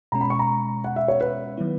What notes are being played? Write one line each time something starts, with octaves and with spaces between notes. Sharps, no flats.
B2 G#3 C#4 A#5
B5
C#6
A#5
F#5
E5
C#5
B4
D#3 F#3 B3 E4